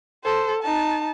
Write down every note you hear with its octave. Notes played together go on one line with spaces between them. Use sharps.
A4 C5
D#4 A5